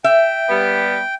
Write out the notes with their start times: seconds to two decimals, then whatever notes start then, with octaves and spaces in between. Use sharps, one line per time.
0.04 E5 G5
0.49 G3 B3